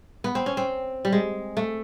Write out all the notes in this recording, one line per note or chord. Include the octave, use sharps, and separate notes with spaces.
B3
C4
C#4
C4
G3
G#3
A3